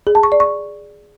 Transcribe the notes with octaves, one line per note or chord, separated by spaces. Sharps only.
G#4
A5
C#6
D5
C#6